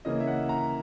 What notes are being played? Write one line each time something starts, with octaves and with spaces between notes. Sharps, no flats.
C#3 E3 A#3 D#5
E5
F#5
A#5